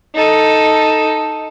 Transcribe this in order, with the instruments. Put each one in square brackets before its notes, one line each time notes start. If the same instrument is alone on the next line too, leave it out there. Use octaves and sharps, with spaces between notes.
[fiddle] D#4 A4